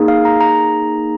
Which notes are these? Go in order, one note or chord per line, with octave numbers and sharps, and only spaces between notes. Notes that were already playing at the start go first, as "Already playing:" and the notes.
Already playing: A#3 D#4 G#4
F5
A#5
A#5